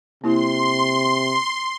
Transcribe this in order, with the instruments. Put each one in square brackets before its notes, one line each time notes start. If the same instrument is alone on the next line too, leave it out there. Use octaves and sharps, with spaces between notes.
[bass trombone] C3 [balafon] A#3 E4 [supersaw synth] C6